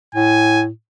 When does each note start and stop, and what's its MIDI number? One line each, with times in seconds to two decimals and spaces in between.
0.15 0.69 45
0.15 0.63 80